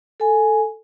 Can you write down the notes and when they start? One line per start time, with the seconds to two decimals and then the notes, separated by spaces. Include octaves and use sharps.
0.20 A4 G#5